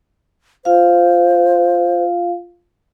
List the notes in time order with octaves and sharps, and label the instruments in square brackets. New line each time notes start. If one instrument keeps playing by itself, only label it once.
[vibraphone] F4 F5 [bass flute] C5